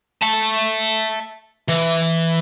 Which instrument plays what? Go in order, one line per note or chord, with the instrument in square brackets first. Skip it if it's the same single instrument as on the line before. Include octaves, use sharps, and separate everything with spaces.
[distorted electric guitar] E5 A5
E3